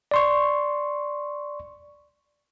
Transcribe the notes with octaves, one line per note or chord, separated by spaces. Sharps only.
D5 C6 C#6